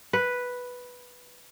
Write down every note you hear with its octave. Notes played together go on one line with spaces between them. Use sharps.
B4